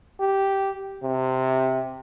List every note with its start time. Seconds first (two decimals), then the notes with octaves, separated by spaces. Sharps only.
0.20 G4
1.03 C3